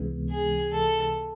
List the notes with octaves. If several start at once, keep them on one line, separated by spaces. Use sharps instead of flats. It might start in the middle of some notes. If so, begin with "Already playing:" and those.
Already playing: C#2 C3 E3 G#3 B3
G#4
A4